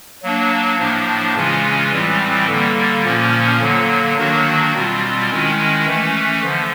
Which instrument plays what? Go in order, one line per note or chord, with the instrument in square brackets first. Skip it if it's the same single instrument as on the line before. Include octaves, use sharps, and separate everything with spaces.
[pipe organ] F#3 A#3 D4
A2 F3 A#3 D4
C#3 E3 G#3 C#4 F4
A2 E3 G3 C4
D3 G3 A#3
A#2 F3 A#3 C#4
D3 F#3 A#3
D#3 F#3 A#3 D4 F#4
B2 G3 C4 F4
D#3 G#3 C#4 E4
E3 A3 C#4
D3 F3